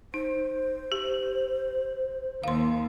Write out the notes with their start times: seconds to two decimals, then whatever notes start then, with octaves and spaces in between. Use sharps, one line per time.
0.14 D#4 C5
0.92 G4
2.44 D#2 F5 C6